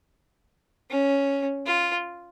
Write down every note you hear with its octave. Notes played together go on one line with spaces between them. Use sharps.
C#4
F4